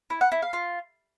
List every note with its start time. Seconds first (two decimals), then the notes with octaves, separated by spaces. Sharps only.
0.10 E4
0.21 F#5
0.32 E4
0.42 F5
0.53 F4